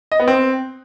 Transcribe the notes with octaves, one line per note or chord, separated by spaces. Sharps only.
D#5
B3
C4